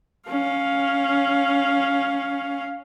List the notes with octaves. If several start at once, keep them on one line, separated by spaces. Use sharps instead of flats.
C#4 F5